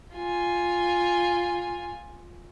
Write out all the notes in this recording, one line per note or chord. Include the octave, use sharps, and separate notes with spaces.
F4 G#5